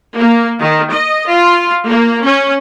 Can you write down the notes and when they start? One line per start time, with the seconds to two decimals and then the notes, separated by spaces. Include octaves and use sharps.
0.16 A#3
0.59 D#3
0.91 D#5
1.27 F4
1.88 A#3
2.24 C#4